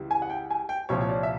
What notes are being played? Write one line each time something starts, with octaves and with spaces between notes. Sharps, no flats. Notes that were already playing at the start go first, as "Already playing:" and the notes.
Already playing: C#2 E3 G3
G#5
F#5
G5
G#5
G5
C2 A#2 F3 C#5
C#5
D5
E5